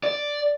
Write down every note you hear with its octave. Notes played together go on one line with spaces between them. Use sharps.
D5